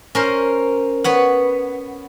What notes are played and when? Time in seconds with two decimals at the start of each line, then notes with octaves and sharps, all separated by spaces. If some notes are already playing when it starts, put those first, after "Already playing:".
0.15 C#4 A#4 C5
1.04 B3 C#5 F#5